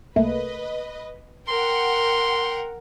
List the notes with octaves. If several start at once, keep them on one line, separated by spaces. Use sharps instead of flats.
C2 A3 A#3 B4 D#5
A#4 F#5 G5 C6